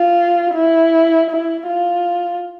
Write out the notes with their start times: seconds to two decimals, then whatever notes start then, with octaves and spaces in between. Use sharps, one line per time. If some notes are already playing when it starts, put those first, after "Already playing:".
Already playing: F4
0.55 E4
1.30 E4
1.68 F4